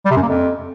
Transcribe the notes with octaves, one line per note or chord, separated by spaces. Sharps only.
G3
C3
F#2
A#3
F2